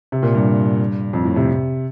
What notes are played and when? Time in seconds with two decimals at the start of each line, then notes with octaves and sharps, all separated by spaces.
0.12 C3
0.23 A#2
0.35 G2
1.13 F2
1.25 A2
1.36 C3